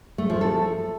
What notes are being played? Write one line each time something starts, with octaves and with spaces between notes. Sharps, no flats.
A3
F3
A4